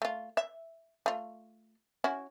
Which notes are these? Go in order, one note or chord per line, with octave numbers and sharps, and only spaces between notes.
A3 F4
E5
A3 F4
C#4 E4 F#4